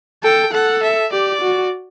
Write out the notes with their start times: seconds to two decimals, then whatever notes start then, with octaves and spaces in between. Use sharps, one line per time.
0.23 A4 G5
0.53 A4 F#5
0.82 E5
1.12 G4 D5
1.41 F#4